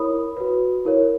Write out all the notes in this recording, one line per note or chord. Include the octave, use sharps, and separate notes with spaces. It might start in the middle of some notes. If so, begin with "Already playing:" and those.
Already playing: E4 A#4 C#5 B5 D#6
F#4 B4
E4 A#4 C#5